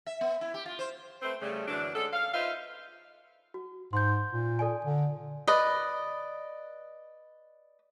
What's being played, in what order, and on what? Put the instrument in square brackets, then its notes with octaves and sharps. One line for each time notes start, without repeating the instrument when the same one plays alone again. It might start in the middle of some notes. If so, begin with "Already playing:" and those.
[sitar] E5
B3
E4
G4
F4
C5
[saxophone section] A3 C4 B4 C5
C#3 G3 A3
F#2 D3 E3 F#3 D4
D3 G#3 C#4 A4
F5
D#4 F4 B4 C5 E5 F5
[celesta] F#4
[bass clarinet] G#2 [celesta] C6 G6
[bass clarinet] A#2
[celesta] A4 D5 G#5
[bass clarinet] D3
[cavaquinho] B4 D5 D#5